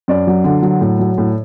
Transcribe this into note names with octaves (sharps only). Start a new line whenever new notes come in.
F#2 D5
F#3
D3
F#3
A2
F#3
A2